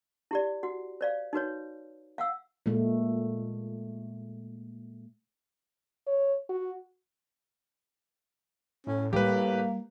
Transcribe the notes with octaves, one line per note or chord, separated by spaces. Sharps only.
E4 G4 D5
F#4 F#5
C5 D5 F5
D#4 F#4 B4 C#5
F5 F#5 E6
A#2 G#3 A3
C#5
F#4
A2 C#4
G3 A#3 G4 B4